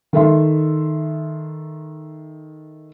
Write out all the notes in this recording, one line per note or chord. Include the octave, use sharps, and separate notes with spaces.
D#3 A4 E5 C6